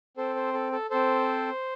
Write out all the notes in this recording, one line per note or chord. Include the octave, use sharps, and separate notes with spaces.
C4 A4 C5
C5
A4
A4
C4 A4 C5